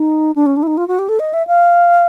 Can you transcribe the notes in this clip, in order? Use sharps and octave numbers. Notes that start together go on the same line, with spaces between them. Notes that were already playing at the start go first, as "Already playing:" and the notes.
Already playing: D#4
D4
C#4
D4
E4
D#4
F4
F#4
G4
A4
D#5
E5
F5